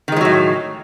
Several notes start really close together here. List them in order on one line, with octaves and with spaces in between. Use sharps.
D#3 G#3 F3 F#3 A2